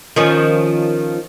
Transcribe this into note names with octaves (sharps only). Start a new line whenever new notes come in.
D#3 F3 C#4